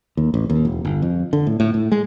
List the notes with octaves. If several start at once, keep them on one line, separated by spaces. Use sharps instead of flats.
D#2
A1
D#2
E1
G1
F2
D3
A2
A2
A2
G#3